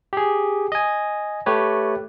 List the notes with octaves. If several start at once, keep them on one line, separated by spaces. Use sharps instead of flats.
G4 G#4
D#5 G#5
A3 G4 B4 C#5